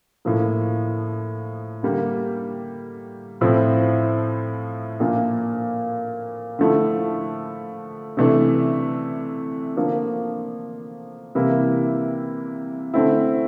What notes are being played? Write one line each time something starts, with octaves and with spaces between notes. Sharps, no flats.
A2 F3 A#3
D3 G3 A#3
A2 F3 C4 E4
A#2 F3 A#3 D4
D3 F3 A3 E4
C3 E3 A3 D4
D3 F3 A#3 D4
C3 E3 G3 A#3 E4
D3 A3 C4 E4